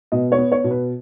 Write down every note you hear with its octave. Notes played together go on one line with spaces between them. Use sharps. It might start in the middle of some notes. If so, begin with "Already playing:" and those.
B2 D#5
C#5
B3
C#5
B2
B4